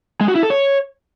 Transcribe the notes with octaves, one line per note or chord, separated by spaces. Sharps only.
G#3
F#4
E4
A4
C#5